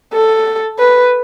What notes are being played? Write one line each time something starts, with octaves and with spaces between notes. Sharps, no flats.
A4
B4